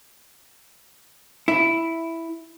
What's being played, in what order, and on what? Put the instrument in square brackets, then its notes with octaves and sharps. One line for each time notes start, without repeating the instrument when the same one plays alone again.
[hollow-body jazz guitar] E4